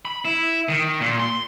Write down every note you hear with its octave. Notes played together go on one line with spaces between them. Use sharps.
B5
E4
D#3
A#2
C6